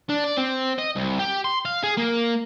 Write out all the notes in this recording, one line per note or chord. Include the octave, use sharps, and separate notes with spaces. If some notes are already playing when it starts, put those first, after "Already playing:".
D4
D5
C4
D#5
C2
G4
C6
F5
G#4
A#3